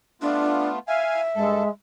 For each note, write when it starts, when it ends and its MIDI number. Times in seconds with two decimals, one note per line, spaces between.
0.22 0.79 57
0.22 0.79 59
0.22 0.69 62
0.22 0.79 65
0.88 1.69 76
0.88 1.21 77
0.88 1.21 80
1.35 1.63 43
1.35 1.69 56
1.35 1.63 69